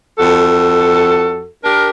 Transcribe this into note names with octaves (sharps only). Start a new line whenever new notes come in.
F2 F#4 A4
D4 G4 A#4